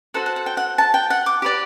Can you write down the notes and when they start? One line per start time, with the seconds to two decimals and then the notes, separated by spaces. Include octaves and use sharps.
0.14 F#4 A4 C5 F#5
0.26 F#5
0.36 F#5
0.46 G5
0.57 F#5
0.78 A5
0.94 G5
1.10 F#5
1.26 D6
1.42 G4 B4 D5